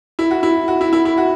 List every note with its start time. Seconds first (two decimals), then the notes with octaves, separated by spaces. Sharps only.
0.19 E4
0.31 F#4
0.43 E4
0.68 F#4
0.81 E4
0.93 E4
1.05 E4
1.18 F#4